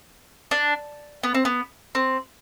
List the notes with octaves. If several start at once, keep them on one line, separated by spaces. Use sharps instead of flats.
D4
B3
C4
B3
C4